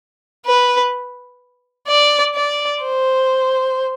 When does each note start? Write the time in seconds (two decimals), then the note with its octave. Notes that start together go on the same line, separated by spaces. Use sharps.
0.46 B4
1.88 D5
2.35 D5
2.83 C5